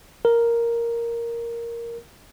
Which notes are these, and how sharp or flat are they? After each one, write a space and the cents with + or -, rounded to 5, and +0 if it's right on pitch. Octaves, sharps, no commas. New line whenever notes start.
A#4 +0